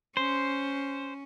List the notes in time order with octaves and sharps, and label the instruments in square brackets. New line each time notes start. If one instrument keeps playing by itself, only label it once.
[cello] C#4 [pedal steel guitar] C5